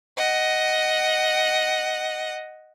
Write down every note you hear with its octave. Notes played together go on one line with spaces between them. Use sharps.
D#5 F#5